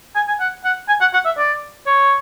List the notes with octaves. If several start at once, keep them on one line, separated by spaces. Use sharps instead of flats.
G#5
G#5
F#5
F#5
G#5
F#5
F#5
E5
D5
C#5